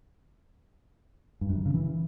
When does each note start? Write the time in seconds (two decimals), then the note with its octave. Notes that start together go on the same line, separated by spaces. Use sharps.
1.41 G2
1.49 F#2
1.58 D#3
1.66 C#3
1.74 E3